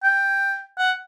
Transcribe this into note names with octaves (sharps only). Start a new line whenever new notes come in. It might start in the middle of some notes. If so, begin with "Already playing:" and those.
G5
F#5